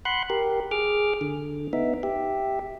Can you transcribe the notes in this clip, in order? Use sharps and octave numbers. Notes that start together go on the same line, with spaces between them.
F#5 B5 C6 F#6
G4 A#4
G#4 D6 F6
D3
B3 D#4 E5
G4 E5